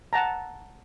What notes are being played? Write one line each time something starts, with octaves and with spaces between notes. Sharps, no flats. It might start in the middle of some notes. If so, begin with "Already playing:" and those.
F#5 A5 A#5